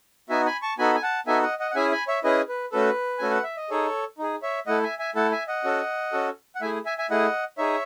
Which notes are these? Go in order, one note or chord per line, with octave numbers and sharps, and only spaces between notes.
B3 D#4 F#4 E5 G#5
G#5 B5
A5 C#6
B3 D#4 F#4 A4 G#5 B5
G#5
F#5 A5
B3 D#4 F#4 A4 E5 G#5
D#5 F#5
D#5 F#5
F#5
C#4 E4 G#4 E5 G#5
G#5 B5
C#5 E5
C#4 E4 G#4 B4 D#5
B4
A3 C#4 F#4 A4 B4
A3 C#4 F#4 A4 G#5
F#5
E5
D#5
D#4 G#4 A4 C#5
D#4 G#4
C#5 E5
A3 E4 A4 D#5 F#5
E5 G#5
E5 G#5
A3 E4 A4 F#5 A5
E5 G#5
D#5 F#5
C#4 F#4 A4
C#4 F#4 A4
F#5
A3 E4 G#4 E5 G#5
E5 G#5
E5 G#5
A3 E4 G#4 D#5 F#5
D#4 G#4 C#5 E5